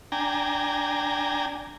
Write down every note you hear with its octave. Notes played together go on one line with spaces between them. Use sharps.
D4 G5 G#5 A#5